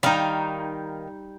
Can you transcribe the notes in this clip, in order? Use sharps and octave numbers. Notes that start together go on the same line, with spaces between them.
D#3 G3 D#4 F5